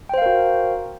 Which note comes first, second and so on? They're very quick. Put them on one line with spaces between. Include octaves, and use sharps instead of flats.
G5 C5 F5 A#4 F#4